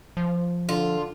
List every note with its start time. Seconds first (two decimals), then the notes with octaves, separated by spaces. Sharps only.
0.17 F3
0.69 D3 F4